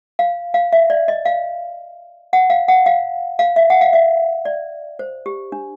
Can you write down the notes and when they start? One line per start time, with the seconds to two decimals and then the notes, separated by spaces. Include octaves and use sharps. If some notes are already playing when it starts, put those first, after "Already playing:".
0.19 F5
0.54 F5
0.73 E5
0.90 D5
1.08 D#5
1.25 F5
2.33 F#5
2.50 F5
2.68 F#5
2.86 F5
3.39 F5
3.56 E5
3.70 F#5
3.81 F5
3.93 E5
4.45 D5
4.99 C5
5.26 G4
5.52 D4